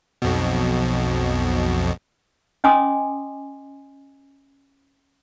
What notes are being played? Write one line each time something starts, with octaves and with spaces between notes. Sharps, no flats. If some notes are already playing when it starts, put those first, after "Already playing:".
B1 F2 B2
C#4 D#5 G#5 C6 D6 D#6